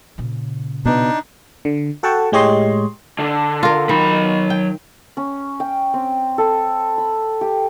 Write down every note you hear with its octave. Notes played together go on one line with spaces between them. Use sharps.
A#2 C#3
B2 B3 D4 D#4
D3
F#4 A4 F#5 G5 A5 C#6
A2 G#3 G4 C#5 D#5 C6
D3
F4 A#4
D#3 F#3 B5
G5
C#4
G5
C4
A4
B5
G4